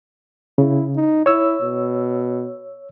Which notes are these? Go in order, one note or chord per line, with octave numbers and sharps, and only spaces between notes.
C#3 E4
D#4
E4 C#5 E6
B2